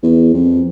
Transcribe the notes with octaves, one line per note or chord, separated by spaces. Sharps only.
E2
F2